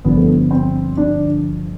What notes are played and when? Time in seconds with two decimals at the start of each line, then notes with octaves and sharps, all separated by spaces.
0.05 G1 G2 D3 F3 B3
0.17 A3
0.28 B3
0.51 C4
0.97 D4